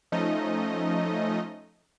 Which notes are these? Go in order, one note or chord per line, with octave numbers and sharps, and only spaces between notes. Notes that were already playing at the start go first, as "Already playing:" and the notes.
F3 A3 C#4 D#4 D#5